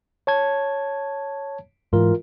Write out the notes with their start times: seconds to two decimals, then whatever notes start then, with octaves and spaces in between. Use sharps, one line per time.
0.27 C#5 A5 G#6
1.93 G#2 E3 F4 A#4